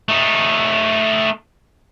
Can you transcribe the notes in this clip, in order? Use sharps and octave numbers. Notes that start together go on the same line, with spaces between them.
A3 D#4